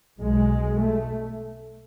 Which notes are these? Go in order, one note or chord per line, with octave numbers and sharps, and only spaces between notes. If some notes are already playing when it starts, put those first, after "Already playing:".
B1 B2 G#3
A3